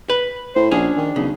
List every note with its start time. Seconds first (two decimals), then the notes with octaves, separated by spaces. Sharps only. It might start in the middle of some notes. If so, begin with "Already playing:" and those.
0.10 B4
0.56 A2 C5
0.71 A#1 C#4 D4 G#4
0.97 D#3
1.16 B1 C#3